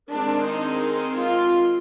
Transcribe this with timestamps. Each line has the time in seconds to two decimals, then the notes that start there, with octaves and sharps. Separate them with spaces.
0.10 D#3 G#3 C4 D4
0.47 D#4
1.19 F4